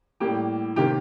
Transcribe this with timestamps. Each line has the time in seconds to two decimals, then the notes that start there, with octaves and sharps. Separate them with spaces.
0.20 A2 G3 A#3 G4
0.76 C3 D#3 A#3 G4